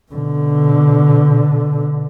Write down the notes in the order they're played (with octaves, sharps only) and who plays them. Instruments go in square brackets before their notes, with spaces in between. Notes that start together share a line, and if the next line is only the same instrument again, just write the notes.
[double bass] B2 D3